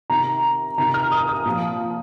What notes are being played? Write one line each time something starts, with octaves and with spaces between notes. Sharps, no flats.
C3 D#3 A#5
C3 D#3 A#5
F6
D#6
D#6
A#2 F3